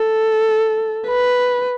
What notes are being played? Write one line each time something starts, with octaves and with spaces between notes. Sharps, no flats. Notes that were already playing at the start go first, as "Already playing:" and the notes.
Already playing: A4
B4